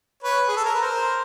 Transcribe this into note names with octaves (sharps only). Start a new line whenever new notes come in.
B4 C#5
G#4
A4
A#4
B4
A#4 C5